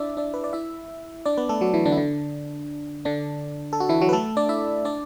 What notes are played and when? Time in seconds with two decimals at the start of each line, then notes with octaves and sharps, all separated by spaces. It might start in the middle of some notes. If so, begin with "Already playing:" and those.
Already playing: D4 E4 D5 E5
0.17 D4 D5
0.34 B4
0.44 D5
0.53 E4 E5
1.25 D4 D5
1.37 B3 B4
1.49 A3 A4
1.61 F#3 F#4
1.74 E3 E4
1.86 D3 D4
1.92 E4
1.97 D3 D4
3.05 D3 D4
3.73 A4
3.80 F#4
3.89 E3 E4
4.01 F#3 F#4
4.09 B4
4.13 A3 A4
4.37 D4 D5
4.49 E4 E5
4.85 D4 D5